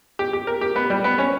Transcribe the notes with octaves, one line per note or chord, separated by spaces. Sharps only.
G4
G4
A#4
G4
B3
G3
B3
C#4